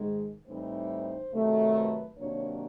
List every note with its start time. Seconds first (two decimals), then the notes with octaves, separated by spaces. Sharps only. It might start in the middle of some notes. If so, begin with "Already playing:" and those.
Already playing: G#2 D#3 G#3
0.47 A2 E3 G3 C4 D#4 C5
1.33 C3 D#3 F#3 A3
1.76 B4
2.18 C3 D#3 F#3 A#3 D4 C#5